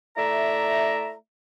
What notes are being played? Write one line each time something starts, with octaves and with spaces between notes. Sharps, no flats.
A3 E4 D5 E5 A#5